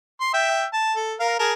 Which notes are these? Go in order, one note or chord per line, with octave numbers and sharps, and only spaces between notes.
C6
E5 G5
A5
A4
A#4 F5
G#4 A#4 A5